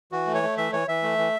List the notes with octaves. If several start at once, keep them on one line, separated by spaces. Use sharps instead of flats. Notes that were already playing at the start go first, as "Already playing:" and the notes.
E3 F#4
A3
C#5
A3
E3 E5
E3 C#5
E3 E5
A3
E3